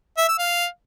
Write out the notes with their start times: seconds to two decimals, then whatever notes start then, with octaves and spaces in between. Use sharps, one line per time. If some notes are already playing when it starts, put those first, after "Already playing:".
0.18 E5
0.28 E6
0.39 F5